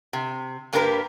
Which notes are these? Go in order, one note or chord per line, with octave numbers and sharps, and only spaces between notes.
C3
G2 A#3 D4 G4 A#4 B4